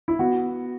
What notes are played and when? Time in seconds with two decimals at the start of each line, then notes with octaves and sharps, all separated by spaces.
0.08 E4
0.19 B3 F#4